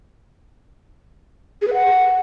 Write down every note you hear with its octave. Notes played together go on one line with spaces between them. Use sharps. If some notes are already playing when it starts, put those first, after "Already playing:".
G#4
B4
F#5